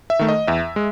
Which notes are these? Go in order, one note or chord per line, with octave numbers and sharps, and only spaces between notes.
E5
D#3 A3
D#5
E2 E5
G#3